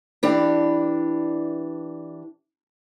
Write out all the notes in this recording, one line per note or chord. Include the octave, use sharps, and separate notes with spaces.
E3 D4 G4